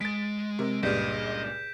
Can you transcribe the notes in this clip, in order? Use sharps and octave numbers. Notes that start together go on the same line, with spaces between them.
G#3 A6 B6 D7
C3 A#4
C#2 G2 A#2 D#5 G6 B6 E7